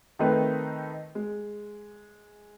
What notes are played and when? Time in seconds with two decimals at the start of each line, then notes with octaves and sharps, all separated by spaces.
0.19 D#3 A3 C4 D#4 B4
1.15 G#3